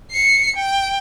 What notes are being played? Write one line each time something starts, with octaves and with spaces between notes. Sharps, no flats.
C7 C#7
G5